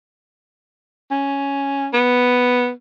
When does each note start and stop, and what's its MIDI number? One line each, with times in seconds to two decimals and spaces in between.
1.11 1.87 61
1.93 2.70 59